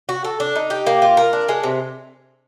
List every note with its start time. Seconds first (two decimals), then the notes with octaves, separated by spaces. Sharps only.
0.09 F#4
0.24 A4
0.40 D4
0.56 D#4
0.70 G4
0.87 A#3
1.02 F4
1.17 A#4
1.33 D4
1.49 G#3
1.64 C3